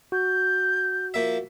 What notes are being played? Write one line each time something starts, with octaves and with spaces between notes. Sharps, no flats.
F#4 G6
F3 A#3 E5